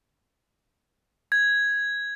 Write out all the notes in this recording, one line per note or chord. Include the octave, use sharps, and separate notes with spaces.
G#6